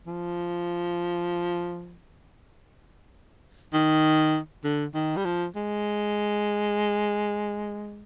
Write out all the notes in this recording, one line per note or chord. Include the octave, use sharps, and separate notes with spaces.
F3
D#3
D3
D#3
G3
F3
G#3